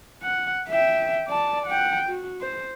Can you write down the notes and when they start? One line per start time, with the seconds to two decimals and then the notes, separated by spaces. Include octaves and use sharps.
0.22 F#5
0.69 E5 G5
1.27 D5 A5
1.67 F#5 G5
2.09 F#4
2.41 C5